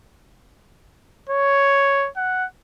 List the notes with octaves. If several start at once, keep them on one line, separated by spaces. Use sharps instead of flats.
C#5
F#5